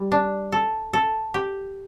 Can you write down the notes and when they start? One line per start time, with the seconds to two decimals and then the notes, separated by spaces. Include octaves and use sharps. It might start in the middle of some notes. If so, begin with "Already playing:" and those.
Already playing: G3
0.12 D4
0.52 A4
0.93 A4
1.34 G4